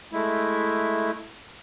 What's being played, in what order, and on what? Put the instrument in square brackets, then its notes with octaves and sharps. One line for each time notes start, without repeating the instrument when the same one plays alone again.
[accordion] G#3 A3 E4